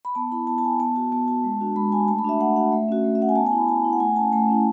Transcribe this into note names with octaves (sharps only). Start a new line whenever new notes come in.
B5
B3 A5
E4 B5
B3 A5
A5
E4 G#5
B3 A5
F#4 A5
B3 A5
F#4 A5
G#3
D4 F#4
G#3 B5
D4 F#4 G#5
A3 A5
B5
D4 F#4 E5
A3 F#5
D4 F#4 F#5
A3 E5
C#4 F#4
A3
E5
C#4 F#4 F#5
G#5
B3 A5
G#5
E4
B5
B3 A5
E4
F#5
A3 G#5
C#4 E4 A5
A3 A5
C#4 E4